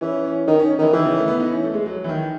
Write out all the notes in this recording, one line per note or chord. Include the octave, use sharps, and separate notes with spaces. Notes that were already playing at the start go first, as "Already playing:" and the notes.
E3 C#4
C#4
D#3 D#4
C#4
C#4
D#3 E3
D#3 E3
C#3
A3
B3
D#4
C#4
A3
G#3
F#3
E3
D#3